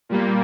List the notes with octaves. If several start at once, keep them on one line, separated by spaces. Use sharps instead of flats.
A#2 G3 A#3